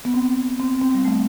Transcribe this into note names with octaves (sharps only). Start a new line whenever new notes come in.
B3
C4
C4
C4
G3
A3